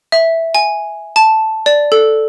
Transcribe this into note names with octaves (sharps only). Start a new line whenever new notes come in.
E5
G#5
A5
D5
A4